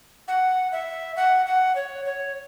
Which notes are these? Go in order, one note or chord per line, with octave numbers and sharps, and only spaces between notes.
F#5
E5
F#5
F#5
C#5
C#5